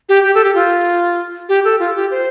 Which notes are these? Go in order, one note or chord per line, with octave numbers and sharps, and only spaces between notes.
G4
G4
A4
G4
F4
G4
A4
F4
G4
C5